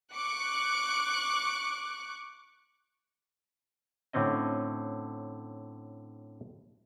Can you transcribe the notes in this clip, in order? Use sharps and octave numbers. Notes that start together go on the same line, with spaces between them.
C#6 D6 F#6
A2 D3 C4 C#4 D#5